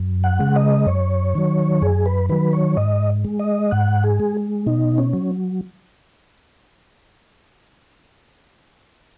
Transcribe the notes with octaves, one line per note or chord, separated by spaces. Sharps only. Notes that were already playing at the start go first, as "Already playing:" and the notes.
Already playing: F#2
F#5
C#3 G#3
D#5
F#2 C#5
D#3 F#3
F#2 G#4
B4
D#3 F#3 B4
C#5
G#2 D#5
G#3
D#5
G#2 F#5
G#4
G#3
B2 D#4
C#4
F#3